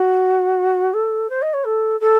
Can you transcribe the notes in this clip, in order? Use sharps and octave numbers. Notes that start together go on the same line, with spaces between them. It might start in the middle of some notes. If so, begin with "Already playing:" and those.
Already playing: F#4
A4
C5
D#5
C#5
A4
A4